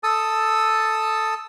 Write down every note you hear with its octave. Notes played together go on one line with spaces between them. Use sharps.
A4 A5 D#6 E6